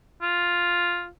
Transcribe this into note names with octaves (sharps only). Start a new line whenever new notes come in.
F4